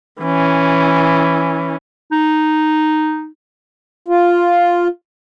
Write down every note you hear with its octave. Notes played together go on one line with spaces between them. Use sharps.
E3 C#4
D#4
F4